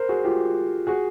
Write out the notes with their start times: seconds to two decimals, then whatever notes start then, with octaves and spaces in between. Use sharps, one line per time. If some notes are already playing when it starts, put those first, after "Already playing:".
Already playing: A#4 C5
0.09 F#4 G#4
0.24 F4 G4
0.87 F#4 G#4